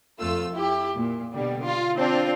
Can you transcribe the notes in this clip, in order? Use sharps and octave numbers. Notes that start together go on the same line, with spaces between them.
F2 A3 F4 E6
E4 G4
A#2
B2 D3 G3
F4
C4 D4 F4